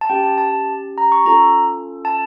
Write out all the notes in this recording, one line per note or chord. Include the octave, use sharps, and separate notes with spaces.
A5
C#4 G4 G5
A5
A5
A#5
C#6
C#4 F4 A4 A#5
A5